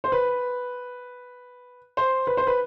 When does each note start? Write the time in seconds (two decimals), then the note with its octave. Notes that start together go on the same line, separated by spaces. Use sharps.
0.04 C5
0.12 B4
1.97 C5
2.27 B4
2.37 C5
2.47 B4